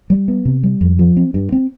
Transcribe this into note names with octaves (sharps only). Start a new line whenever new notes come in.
G3
B3
C3
G3
F2
F3
C4
G2
C4